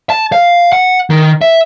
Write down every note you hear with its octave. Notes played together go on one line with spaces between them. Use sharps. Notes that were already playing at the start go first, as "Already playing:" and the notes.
A5
F5
F#5
D#3
E5